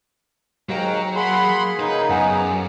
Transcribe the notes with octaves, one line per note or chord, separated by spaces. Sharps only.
D#2 G#2 F#3 F5 G5 A#5
A#3 G#4 F#5 B5 C6
C#3 D#4 B4
F#2 B3 F#5 G#5